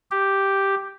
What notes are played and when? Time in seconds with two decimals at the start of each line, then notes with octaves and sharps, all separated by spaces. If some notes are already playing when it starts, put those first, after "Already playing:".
0.11 G4